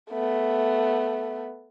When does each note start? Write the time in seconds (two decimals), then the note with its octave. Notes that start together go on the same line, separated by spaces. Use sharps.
0.10 A3 B3